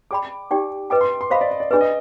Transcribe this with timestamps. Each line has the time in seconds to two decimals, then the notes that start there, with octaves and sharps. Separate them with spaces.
0.11 G#4 D5 G5 B5 D6
0.51 D#4 G4 D5 G5
0.90 B4 D#5 G5 D6
1.01 C6
1.21 C6
1.31 C5 D#5 F5 B5
1.41 D5
1.51 D#5
1.60 D5
1.71 D4 G#4 B4 D5
1.81 D#5